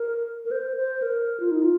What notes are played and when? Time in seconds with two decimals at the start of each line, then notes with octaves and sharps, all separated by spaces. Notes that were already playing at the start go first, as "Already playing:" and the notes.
Already playing: A#4
0.45 A#4
0.51 C5
0.77 C5
1.02 A#4
1.40 F4
1.51 D#4
1.62 F4